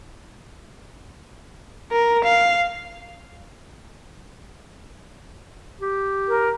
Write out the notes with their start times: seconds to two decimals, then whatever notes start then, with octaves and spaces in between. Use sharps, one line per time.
1.92 A#4
2.24 F5
5.80 G4
6.28 A#4